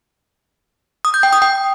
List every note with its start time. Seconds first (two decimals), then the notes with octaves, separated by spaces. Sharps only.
1.05 D#6
1.14 G6
1.23 G5
1.33 D#6
1.42 G5